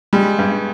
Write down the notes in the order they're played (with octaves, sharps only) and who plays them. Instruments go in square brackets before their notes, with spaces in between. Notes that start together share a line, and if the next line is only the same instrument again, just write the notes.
[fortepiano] G3 [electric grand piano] G#3
[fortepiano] G2